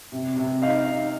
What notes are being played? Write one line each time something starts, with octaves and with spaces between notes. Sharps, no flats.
C3
C3
D#4 F5
D#4